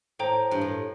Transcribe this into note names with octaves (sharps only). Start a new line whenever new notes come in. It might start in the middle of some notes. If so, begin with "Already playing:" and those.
A2 C5 G5 A#5
G2
A2